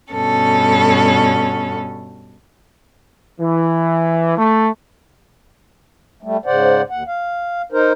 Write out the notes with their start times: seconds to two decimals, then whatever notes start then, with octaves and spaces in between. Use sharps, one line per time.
0.12 G2 B2 C#4 A4
3.40 E3
4.37 A3
6.23 G3 A3
6.46 G#2 C#3 C5 D5 F#5
6.90 D#2 F#5
7.07 F5
7.72 D#4 A#4 C5